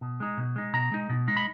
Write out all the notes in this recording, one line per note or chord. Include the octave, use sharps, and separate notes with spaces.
B2
G#3 D#4
B2
G#3 D#4
B2 A#5
G#3 D#4
B2
G#3 D#4
B5